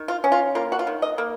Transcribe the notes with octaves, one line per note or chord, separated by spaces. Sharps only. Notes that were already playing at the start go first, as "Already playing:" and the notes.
Already playing: D#3
F4
C#4
F4
A#3 F4
F#4
F4
D#3
D#5
A#3